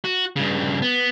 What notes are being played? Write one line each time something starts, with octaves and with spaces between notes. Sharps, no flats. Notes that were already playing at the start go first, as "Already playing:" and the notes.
F#4
G2 C#3
B3